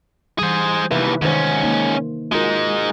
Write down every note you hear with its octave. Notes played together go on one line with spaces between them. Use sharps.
E3 G3 G#4 C5
D#2 C3 E3 B4 E5
G#2 D#3 C#4 C5
A#3 D#4
G#3 D#4 F4 F#4 A#4